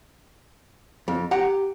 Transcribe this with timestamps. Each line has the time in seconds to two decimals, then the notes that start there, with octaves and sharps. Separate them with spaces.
1.08 F2
1.31 G4 F#5 A#5